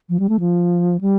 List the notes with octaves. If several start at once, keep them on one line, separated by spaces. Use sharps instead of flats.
F3
G3
A3
F3
G3